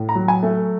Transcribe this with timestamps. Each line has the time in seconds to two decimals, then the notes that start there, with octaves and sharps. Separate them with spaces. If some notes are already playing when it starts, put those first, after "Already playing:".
Already playing: A2
0.09 A#5
0.15 F#3
0.28 G#5
0.43 A3